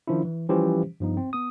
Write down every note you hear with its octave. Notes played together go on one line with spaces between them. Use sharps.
D#3 F3 C#4 D4 E4
E3
E3 F3 G3 C#4 G4 C5
G2 F3 B3 D#4
C4
B3 D#6